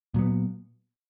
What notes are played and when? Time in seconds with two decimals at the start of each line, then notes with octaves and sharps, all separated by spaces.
0.14 A#2 F#3 B3